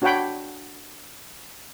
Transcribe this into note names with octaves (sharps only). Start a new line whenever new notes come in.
D4 F#4 C#5 F#5 G5 B5